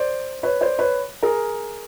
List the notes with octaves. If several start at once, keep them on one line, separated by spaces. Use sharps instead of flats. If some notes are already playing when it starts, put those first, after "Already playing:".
Already playing: C5 D5
B4 C#5
C5 D5
B4 C#5
G#4 A#4